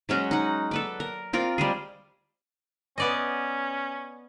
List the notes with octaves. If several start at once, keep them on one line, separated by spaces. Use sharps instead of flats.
F#3 G#3 C#4 F#4
D#4 F#5
A4 B4 D5
A#4
C4 F4 A#4 D5
G3 G#3 G#4
B3 C#4 D5 D#5